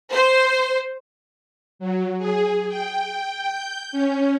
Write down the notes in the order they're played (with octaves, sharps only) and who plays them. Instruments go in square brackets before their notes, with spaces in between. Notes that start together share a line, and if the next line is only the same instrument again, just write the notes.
[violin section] C5
[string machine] F#3
G#4
G5
G6
C#4